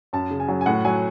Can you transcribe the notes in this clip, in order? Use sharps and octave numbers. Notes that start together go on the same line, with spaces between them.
F#2 A5
C#3
G#5
F#3
G#5
A2 F#5
F#3 G#5